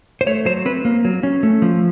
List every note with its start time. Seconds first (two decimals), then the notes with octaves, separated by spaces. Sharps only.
0.21 C5
0.27 A3 C#5
0.45 F#3 C5
0.65 C4 B4
0.85 A#3
1.05 F#3
1.23 C#4
1.43 A3
1.62 F3